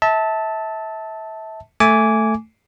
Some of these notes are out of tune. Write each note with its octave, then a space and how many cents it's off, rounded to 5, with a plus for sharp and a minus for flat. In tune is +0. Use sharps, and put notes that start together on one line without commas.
E5 -30 A5 +0
A3 +0 G#5 +0 D6 -20